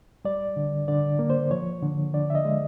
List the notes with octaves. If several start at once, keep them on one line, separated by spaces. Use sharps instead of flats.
G3 D5
D3
D3 D5
A#3
C5
F3 C#5
D3
D3 D5
E5
D#5
G#3